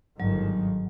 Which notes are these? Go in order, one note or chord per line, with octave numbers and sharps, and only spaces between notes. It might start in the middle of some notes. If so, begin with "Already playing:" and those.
G1 G#2 D#3 F#3